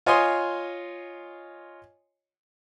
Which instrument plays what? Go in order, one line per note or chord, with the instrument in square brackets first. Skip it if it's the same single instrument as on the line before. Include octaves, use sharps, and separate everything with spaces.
[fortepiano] F4 C#5 D#5 G#5 C6 D#6